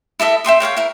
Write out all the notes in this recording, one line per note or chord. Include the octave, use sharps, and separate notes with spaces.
E4 A4 D#5 E5
E5 G5 C6 D#6
A#4 C#5 F5 G5
E4 A#4